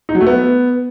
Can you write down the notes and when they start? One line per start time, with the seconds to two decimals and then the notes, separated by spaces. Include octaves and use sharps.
0.09 D#4
0.15 F#3
0.21 A3
0.27 B3